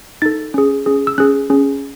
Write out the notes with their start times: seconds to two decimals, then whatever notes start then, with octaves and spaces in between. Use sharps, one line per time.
0.22 D#4 A4 A6
0.54 C#4 G#4
0.86 C#4 G#4
1.07 E6
1.18 C#4 G#4 F#6
1.50 C#4 G#4